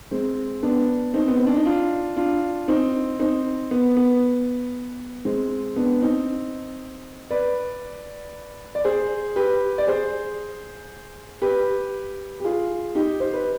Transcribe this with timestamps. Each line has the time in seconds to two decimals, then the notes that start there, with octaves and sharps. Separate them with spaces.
0.11 G#3 C4
0.63 B3 D4
1.14 C4 D#4
1.28 B3
1.37 C4
1.47 D4
1.56 D#4
1.65 D4 F4
2.16 D4 F4
2.68 C4 D#4
3.19 C4 D#4
3.71 B3
3.97 B3
5.25 G#3 C4
5.76 B3 D4
6.02 C4 D#4
7.30 B4 D5
8.75 D5
8.84 G#4 C5
9.36 G4 B4
9.78 D5
9.87 G#4 C5
11.42 G4 B4
12.40 G4
12.45 F4 G#4
12.95 D#4 G4
13.20 C5
13.33 B4